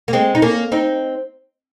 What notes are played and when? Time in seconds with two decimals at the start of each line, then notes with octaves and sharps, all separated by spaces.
0.08 A#3
0.13 G#3 C4
0.35 D#4
0.42 A#3 C#4
0.72 C4 D#4